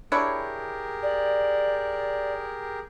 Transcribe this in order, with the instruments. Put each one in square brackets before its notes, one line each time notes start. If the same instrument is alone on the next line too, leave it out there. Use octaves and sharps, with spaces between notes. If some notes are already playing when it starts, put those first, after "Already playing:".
[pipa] D4 E4 C#5 [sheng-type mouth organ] G4 G#4 A#4
[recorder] D5